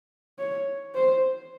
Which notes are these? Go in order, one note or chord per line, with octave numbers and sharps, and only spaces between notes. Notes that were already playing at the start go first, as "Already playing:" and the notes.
C#5
C5